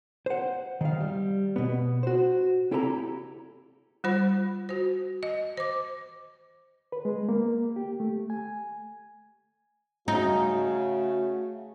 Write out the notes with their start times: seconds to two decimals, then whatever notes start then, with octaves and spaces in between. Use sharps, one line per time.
0.26 C5 F#5
0.81 D#3 F5
1.00 G3
1.56 B2 B3
2.03 F#4 C5
2.71 C4 E4 G4 A4 A5 A#5
4.04 G3 F4 C5 B5
4.69 F#4 C5
5.23 D#5
5.57 C5 D6
6.92 B4
7.05 G#3
7.29 A#3
7.76 G4
8.00 A3
8.30 G#5
10.08 C#3 A3 D#4 F#4